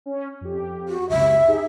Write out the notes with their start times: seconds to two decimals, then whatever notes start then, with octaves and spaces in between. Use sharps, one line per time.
0.06 C#4
0.41 F2 G4
0.89 F#4
1.09 C#2 F#2 C3 E5
1.47 D#4 G4 G#4